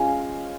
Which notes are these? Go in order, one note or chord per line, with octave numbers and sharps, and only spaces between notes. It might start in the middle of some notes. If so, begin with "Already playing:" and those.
Already playing: G#3 C#4 F4 F5